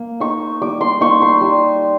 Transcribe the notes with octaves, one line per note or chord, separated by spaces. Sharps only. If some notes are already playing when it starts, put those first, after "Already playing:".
Already playing: A#3
D#4 C#6
G3 D6
C6
A#3 D#4 C#6
C6
G3